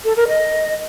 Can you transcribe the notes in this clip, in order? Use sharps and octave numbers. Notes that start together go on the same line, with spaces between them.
A4
A#4
D#5